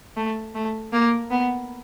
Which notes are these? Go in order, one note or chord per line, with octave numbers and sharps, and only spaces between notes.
A3
A3
A#3
B3